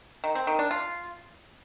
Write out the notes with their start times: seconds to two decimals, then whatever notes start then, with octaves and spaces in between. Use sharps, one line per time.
0.24 D#3
0.35 C4
0.47 D#3
0.59 D4
0.71 F4